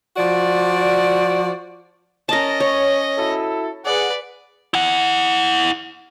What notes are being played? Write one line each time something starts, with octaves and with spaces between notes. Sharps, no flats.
F3 F#4 D5
C#4 A#4 D#5 A5
C#5
E4 F#4 A4
G#4 B4 D5 F#5
E4 F#5